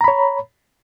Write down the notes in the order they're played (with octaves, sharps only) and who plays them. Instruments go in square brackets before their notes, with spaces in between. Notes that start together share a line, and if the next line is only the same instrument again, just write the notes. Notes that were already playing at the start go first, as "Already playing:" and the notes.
[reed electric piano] A#5
B5
C#5